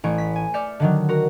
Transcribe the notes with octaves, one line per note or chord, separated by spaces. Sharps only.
A1 C#5 D7
B6
G#5
D5 E5 F6 G6 C#7
D3 D#3 F#3
F#4 A#4